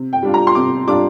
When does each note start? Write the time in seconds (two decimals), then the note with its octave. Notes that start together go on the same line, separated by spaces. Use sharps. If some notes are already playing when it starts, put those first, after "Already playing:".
Already playing: C3
0.13 G5
0.23 G3 D4 F4
0.34 A#5
0.47 C6
0.55 C3 D6
0.87 G3 D4 F4 D6